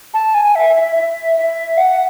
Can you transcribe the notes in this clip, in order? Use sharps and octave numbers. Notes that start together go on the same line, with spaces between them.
A5
G#5
E5
E5
E5
E5
F#5